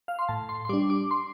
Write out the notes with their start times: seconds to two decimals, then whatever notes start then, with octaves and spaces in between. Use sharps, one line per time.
0.08 F5
0.19 C6
0.28 A2 A5
0.49 C6
0.65 C6
0.69 G3 D4 D6
0.90 D6
1.11 C6